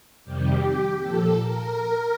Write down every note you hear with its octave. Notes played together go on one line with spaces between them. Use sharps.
F2 C3 D#3 G3 G4
A#2 F3 A4
A#4